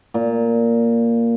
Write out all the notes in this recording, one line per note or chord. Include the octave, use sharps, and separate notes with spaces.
A#2